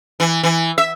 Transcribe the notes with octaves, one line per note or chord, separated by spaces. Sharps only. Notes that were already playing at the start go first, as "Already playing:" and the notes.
E3
E3
E5